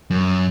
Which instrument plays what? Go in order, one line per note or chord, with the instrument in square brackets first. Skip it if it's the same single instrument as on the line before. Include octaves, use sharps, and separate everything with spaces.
[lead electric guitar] F#2